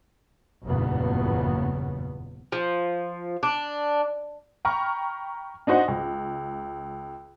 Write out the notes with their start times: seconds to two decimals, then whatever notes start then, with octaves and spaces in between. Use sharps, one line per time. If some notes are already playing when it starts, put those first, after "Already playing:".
0.65 F#1 E2 G2 A#2 C#3 B3
2.52 F3
3.43 D4
4.65 G5 A#5 B5 C#6 F6
5.67 D4 D#4 F#4 C5 D#5 F#5
5.88 C#2